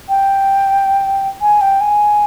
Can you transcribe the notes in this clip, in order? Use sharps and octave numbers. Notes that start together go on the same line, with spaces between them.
G5
G#5
G5
G#5